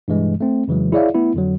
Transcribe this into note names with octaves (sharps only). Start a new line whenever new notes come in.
G2 B2 E3 G#3
A3 C4
F2 C#3 E3 F#3 G#3
E4 G#4 C#5 D5 E5 F5
A3 B3 E4
F2 D3 F#3